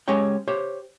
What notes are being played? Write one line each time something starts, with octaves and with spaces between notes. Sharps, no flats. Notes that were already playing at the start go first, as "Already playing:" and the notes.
G#3 C#4 G4 C#5 G5
G4 C5 C#5